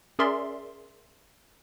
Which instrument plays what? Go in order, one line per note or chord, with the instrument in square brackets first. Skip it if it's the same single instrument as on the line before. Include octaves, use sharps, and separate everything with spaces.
[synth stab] C#4 G#4 A#4 D5 E5 C6